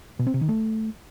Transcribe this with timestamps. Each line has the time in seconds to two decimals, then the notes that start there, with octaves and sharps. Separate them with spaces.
0.19 B2
0.27 C4
0.34 C3
0.41 D#3
0.49 A3